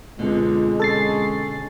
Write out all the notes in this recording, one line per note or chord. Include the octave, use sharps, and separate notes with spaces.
C#2 B2 D3 G#3 C4
C#4 A4 A6 C7